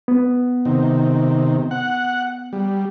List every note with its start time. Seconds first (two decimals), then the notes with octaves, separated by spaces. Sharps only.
0.08 B3
0.65 C3 D#3
1.71 F#5
2.53 G3